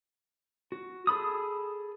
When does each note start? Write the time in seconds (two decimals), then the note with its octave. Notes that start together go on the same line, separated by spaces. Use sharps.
0.72 F#4
1.07 G#4 A4 B5 D#6